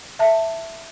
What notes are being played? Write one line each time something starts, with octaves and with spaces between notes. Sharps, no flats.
E5 A5